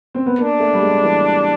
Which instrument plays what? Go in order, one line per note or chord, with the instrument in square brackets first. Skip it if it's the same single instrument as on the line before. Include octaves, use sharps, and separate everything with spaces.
[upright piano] C4
B3
[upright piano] A#3 [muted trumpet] D4
[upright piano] A3
G3
G#3
E3